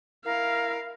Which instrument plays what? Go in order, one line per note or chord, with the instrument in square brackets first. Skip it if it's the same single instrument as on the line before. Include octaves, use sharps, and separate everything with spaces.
[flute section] E4 A#4 [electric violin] F5